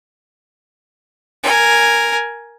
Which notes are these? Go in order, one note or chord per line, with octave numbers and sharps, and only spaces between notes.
A#4 G#5